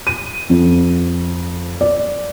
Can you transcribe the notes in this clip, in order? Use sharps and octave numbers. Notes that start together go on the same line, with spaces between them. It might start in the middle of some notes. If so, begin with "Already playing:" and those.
D#7
F2
D5